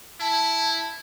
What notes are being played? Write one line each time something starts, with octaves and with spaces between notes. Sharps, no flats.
E4 A5